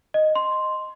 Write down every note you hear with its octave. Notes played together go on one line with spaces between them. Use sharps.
D#5
C6